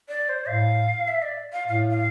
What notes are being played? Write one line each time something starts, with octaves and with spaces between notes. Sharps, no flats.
D5
C5
A2 F5
E5
D5
F5
A2 F5
F5